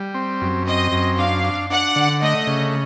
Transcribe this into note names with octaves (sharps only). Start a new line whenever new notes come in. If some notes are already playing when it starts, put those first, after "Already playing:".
Already playing: G3
C4
F#2
C4 D#5
F#2
D4 F5
D4
D4 F#5
D3
A3 D#5
C#3